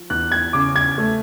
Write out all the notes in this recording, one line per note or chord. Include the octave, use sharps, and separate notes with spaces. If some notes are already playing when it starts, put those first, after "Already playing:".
Already playing: F3
E2 F#6
G#6
C#3 D6
G#6
A3